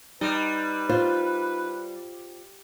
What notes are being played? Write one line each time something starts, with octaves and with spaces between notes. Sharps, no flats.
G3 D#4 B4
F4 C5